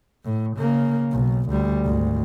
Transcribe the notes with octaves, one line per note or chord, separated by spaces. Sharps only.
A2
C#3 A#3
B1
D2 G3
G#1 D2